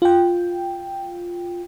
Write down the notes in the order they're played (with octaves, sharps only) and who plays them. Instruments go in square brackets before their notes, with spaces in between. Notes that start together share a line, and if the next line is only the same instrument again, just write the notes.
[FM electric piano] F4 G5